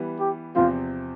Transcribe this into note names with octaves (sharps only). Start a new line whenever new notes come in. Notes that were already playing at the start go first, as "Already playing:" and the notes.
Already playing: E3 G3 B3
G4
E2 C3 F3 C4 F4